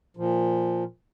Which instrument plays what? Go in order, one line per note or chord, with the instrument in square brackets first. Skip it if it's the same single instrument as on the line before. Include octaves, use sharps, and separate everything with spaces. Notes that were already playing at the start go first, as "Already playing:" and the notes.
[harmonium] A#2 F3